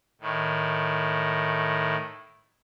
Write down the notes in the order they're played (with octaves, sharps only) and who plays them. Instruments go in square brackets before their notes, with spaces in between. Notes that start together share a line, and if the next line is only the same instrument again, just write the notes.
[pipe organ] A2 D#3